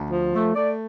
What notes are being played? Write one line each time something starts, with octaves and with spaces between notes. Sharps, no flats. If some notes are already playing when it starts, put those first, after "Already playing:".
Already playing: D2
F3
A3
A3 D5